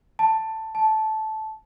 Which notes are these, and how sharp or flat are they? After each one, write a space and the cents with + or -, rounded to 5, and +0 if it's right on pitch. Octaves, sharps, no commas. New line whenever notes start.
A5 +10
A5 -15